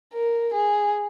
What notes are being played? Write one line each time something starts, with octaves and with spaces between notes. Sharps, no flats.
A#4
G#4